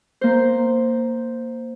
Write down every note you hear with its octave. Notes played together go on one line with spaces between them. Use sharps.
A#3 C5